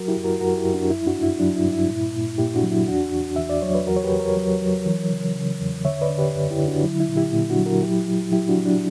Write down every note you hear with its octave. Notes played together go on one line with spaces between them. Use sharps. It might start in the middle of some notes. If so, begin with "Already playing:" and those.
Already playing: F#3 F#4 A#4
E4 G4
F#2
F#4 A#4
F#2 F#4 A#4
E4 G4
F#2
D4 F#4
G2 E4
D4 F#4
G2
E4
F#3 D4
E4
G2
E4
A#2
A#2
A#2 E4 G4
D4 F#4
F#3
E4
E2 D4 F#4
E2
E2 E5
D5
F#3 C#5
B4
E2 F#4 A#4
C#5
G4 B4
E2
A#4 C#5
F#3
F#3
E3
C#3
C#3
E2
D3 C#5 E5
B4 D5
D3
G4 B4
F#2
E4 G4
D3
D4 F#4
F#3 E4
E4
A#2
E4 G4
A#2 E4
D4 F#4
F#3
F#4 A#4
F#3 E4 G4
F#3
F#3 E4 G4
D4 F#4
F#3
D4